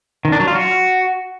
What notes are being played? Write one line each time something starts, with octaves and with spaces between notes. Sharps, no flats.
D#3
D4
F#3
F4
F#4